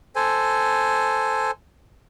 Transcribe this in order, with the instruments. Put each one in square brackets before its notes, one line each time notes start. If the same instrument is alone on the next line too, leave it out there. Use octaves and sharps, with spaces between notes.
[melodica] A4 C5 G#5